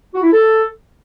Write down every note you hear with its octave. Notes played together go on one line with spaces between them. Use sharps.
F#4
E4
A4